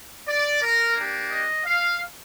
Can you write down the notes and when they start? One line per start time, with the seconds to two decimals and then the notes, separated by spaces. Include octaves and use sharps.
0.27 D5
0.62 A#4
0.95 A#3 D4 G4
1.30 D#5
1.65 F5